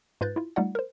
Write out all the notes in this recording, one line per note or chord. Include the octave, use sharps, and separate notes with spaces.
G#2 F4 B4 F#6 G6 A6
E4 F4
G3 A3 D#4 F4 D5 F#5
A#4 C5